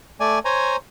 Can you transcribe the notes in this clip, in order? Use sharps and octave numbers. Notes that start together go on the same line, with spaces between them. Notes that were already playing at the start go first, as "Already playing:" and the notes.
A3 D5 G#5
C5 C#5 G#5 A#5